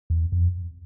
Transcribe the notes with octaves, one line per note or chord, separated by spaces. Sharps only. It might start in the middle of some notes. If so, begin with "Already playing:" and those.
E2
F2